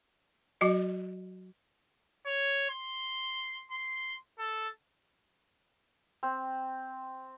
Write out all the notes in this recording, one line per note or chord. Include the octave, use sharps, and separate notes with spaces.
F#3 F#4 D#5
C#5
C6
C6
A4
C4